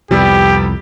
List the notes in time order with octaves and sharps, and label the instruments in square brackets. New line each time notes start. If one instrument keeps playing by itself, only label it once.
[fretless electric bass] C2 F2 [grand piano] C3 G3 B3 [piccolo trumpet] G4